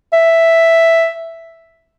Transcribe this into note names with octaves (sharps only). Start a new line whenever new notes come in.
E5